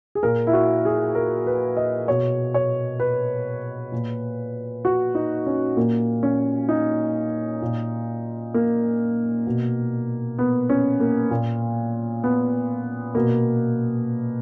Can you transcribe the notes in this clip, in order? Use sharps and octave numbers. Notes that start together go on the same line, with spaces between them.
G#4
A#2 A#4
E4
F#4
G#4
A#4
B4
D#5
B2 C#5
C#5
B4
A#2
F#4
D#4
C#4
A#2 A#3
C#4
D#4
A#2
A#3
B2
B3
C#4
A#3
A#2
B3
B2 A#3